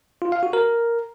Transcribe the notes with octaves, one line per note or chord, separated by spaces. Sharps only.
F4
F5
F#4
A#4